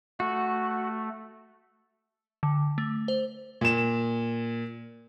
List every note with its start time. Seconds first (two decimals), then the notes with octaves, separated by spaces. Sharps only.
0.20 A3 F#4
2.43 D3
2.78 A3
3.08 C5
3.61 A#2 E7